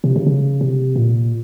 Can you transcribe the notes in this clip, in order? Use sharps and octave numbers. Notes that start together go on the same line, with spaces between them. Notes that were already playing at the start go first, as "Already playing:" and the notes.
C3
C#3
C#3
C3
A#2